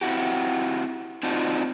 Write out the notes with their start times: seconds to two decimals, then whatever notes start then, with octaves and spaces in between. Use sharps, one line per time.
0.01 C4 E4 F#4 G4
1.23 C4 D4 D#4 F4 F#4